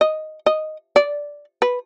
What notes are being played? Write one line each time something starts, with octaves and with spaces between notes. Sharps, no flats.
D#5
D#5
D5
B4